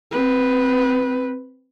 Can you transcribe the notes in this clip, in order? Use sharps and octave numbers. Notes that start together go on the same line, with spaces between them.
C4 B4